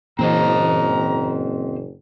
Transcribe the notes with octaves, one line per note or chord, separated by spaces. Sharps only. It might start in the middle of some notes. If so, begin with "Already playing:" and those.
F#1 A#2 E3 C4 C5 D#5 A#5